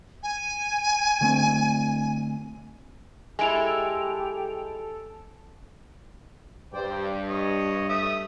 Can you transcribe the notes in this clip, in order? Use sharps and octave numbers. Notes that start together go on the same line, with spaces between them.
G#5
D3 A3 C4
G#3 E4 G4 A4 G#5 D7 F7
G2 C5 D5 G5
C#5 D#5
A3 E5 D#6